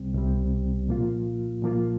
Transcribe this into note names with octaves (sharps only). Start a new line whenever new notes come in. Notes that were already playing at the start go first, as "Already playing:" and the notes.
Already playing: C2 C3 G3 C4
C2 C3 G3 C4
A#2 F3 A#3 F4
A#2 F3 A#3 F4